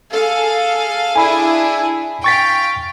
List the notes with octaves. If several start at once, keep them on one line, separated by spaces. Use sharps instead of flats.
G#4 A4 F5
D4 E4 G#4 G#5 B5
F5 G5 C#6 A6 B6